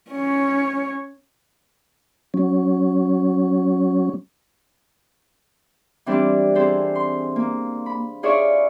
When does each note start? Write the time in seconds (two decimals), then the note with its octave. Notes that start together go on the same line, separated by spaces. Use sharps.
0.11 C#4 C#5
2.34 F#3 C#4
6.06 E3 G3 C4 D4 D5
6.55 C4 G#4 A4 C5
6.95 C6
7.36 A#3
7.86 B5
8.23 F4 G#4 C#5 D5 E5 C#6